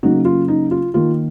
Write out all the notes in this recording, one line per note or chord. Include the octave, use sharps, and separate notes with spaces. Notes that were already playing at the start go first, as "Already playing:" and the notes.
C#3 F#3 A#3 D#4 F#4
F4
D#4
F4
D#3 A#3 F4